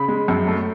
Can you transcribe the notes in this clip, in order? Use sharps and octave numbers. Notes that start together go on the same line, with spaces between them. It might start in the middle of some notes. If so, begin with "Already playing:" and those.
Already playing: C#3 B5
G#3
F#2
A3